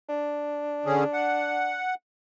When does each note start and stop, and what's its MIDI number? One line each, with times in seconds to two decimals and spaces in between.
0.09 1.82 62
0.86 1.04 50
0.86 1.04 61
0.86 1.04 68
1.13 1.94 78